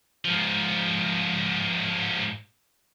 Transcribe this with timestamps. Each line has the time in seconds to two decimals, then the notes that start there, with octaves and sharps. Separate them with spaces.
0.25 G#2 F3